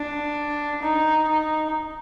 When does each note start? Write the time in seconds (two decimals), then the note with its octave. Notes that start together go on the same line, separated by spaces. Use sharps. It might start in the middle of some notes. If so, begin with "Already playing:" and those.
Already playing: D4
0.82 D#4
1.28 D#4